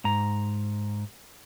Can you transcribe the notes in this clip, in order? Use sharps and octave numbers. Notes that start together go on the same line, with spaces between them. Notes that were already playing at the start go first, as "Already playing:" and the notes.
G#2 A#5